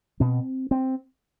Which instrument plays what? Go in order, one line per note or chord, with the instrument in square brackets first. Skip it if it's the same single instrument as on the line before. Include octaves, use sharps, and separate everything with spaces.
[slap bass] B2 C4
C4